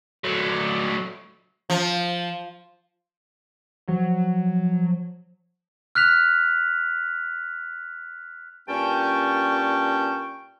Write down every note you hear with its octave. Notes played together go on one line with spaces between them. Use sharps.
F#3 A3
F3
F3 F#3
F6 F#6 B6 F7
G2 A#2 C#4 G5 A5 C#6